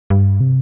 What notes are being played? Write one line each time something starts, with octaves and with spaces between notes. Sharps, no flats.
G2
C3